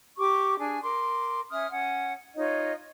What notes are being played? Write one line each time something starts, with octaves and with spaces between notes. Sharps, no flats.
G4 C#6 D6
D4 G#4 G#5
A#4 C6 D6
C#4 E5 D#6 F6
C#4 F#5
D#4 F4 C#5 D#5